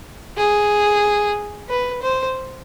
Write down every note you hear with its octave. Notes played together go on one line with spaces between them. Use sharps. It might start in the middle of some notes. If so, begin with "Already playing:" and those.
G#4
B4
C5